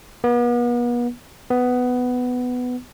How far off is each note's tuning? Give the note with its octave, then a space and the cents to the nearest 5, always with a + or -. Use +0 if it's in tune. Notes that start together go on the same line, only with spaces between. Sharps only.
B3 -40
B3 +10